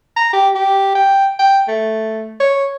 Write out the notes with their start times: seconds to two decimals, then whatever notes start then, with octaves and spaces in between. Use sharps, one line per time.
0.16 A#5
0.33 G4
0.55 G4
0.95 G5
1.40 G5
1.68 A3
2.40 C#5